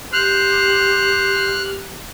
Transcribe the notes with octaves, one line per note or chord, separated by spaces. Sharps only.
G4 C5 F6 F#6